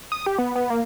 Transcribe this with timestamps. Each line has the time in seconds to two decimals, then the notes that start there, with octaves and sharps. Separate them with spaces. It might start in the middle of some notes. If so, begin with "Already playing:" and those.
0.12 D#6
0.26 G4
0.38 B3
0.56 B3
0.70 A#3